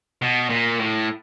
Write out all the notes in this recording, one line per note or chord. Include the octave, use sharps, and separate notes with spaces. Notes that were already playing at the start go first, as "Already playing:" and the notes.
B2
A#2
A2